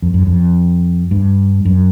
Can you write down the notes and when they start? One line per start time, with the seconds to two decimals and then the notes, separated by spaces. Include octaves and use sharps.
0.02 F2
0.14 F#2
0.27 F2
1.11 G2
1.65 F#2